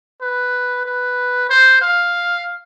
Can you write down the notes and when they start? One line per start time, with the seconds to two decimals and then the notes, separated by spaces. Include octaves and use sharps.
0.22 B4
0.85 B4
1.50 C5
1.81 F5